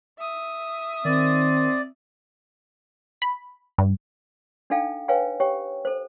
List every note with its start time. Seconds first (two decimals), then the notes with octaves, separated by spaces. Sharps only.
0.19 E5 D#6
1.05 D#3 C4 D5
3.22 B5
3.78 G2
4.70 D4 D#4 A4 F5 G5
5.08 B4 C#5 F5 G5 G#5
5.40 G4 C#5 G5
5.85 A4 C5